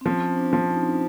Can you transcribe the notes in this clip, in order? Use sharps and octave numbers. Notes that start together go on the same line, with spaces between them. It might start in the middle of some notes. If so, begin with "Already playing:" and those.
C4
F3 C#4
D4
F3
D#4